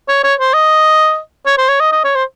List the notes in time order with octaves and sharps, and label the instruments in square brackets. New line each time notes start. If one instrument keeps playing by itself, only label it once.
[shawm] C#5
C#5
C5
D#5
C#5
C5
C#5
D#5
D#5
C#5
C5